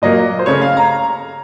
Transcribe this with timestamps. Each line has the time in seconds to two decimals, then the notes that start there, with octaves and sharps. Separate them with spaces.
0.02 A#2 F#3 A#3 D#5
0.39 C5
0.46 C#3 A3 C#5
0.61 F5
0.77 A#5